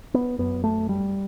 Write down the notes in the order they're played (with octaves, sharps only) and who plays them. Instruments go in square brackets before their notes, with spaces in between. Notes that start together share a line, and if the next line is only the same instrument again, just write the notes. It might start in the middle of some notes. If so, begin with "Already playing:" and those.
[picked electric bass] B3
F#2 B3
A3
G3